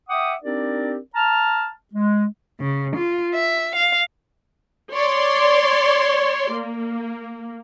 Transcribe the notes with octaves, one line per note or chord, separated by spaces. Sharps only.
E5 F#5 G5 D6 D#6
C4 D4 D#4 G4 A#4 D5
A5 A#5 F6
G#3
C#3
F4
E5
F5
C#5 D5 C6
A#3